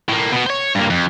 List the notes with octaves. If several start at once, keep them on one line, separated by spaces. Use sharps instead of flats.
A2 A#3
B2 B3
C5 C#5
G2 A#3
F2